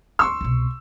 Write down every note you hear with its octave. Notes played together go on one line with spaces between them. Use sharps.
D2 D4 C6 C#6 E6
C2 B2